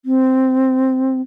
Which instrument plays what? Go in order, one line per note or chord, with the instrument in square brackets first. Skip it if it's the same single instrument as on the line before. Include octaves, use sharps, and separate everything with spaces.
[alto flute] C4